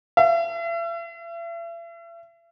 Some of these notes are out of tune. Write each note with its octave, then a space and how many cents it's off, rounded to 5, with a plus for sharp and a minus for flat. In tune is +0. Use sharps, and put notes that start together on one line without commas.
E5 +40